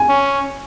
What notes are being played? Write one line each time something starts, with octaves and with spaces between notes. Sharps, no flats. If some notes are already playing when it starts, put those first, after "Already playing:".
Already playing: G#5
C#4